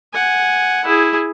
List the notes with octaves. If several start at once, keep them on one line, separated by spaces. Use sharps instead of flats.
F#5 G#5
E4 G#4